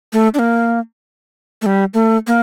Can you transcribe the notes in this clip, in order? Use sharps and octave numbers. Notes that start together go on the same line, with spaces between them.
A3
D4
A#3
A3
G3
A3
A#3